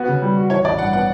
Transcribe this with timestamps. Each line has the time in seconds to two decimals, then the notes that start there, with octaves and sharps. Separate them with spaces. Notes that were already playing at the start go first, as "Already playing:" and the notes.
Already playing: B3 F#4
0.08 C#3
0.22 G3
0.37 F#4
0.50 E3 C#5
0.64 A1 D5
0.79 G2 F#5
0.93 B3 F#5